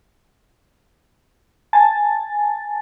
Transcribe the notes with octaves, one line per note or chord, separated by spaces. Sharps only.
G#5 A5 A6